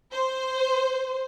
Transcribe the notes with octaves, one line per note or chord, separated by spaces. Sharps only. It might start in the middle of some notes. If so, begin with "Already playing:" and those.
C5